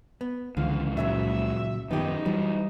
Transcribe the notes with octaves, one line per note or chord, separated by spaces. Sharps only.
B3
C#2 D3 E3 F3 F5
A#2 C#3 F#3 E5
F#2 D#3 F3 B3 D#4 G4
E3 F#3 G3